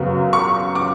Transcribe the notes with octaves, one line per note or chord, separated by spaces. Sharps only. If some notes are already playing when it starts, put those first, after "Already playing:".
Already playing: F#2 C#3 F#3 B3
C#6
D6